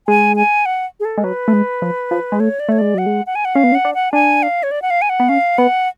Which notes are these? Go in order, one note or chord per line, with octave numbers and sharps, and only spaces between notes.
G#3 G#5
G#5
F#5
G#4
A4
G#3
F#3 B4
A3
G#3
F3
F3
G#3
A3 C#5
D5
A3 C#5
G#3 D5
F#3 F#5
G#3
F#5
G#5
F#5
C#4 F5
B3
C#4
F#5
D4
F#5
D4 G#5
F5
C#5
D5
F#5
F5
G#5
F#5
B3
C#4 F5
B3 F#5